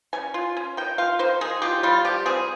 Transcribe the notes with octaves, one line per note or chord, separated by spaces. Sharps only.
C#4 G#5
F4
C#4
D#3 G5
F4 F5
D#3 C5
D#3 G#4
F4 G4
G3 F4
F3 G4
C4 G#4